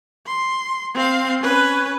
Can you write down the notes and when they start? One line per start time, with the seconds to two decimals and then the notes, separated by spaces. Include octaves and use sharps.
0.26 C6
0.94 C4 F5
1.41 C#4 B4